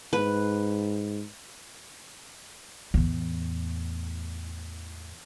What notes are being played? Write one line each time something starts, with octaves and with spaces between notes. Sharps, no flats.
G#2 B4
E2 A2